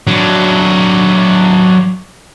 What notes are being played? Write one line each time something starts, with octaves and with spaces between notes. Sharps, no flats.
F#3 D4